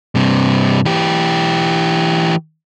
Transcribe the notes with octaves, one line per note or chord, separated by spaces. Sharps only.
G2 C3
E3 G4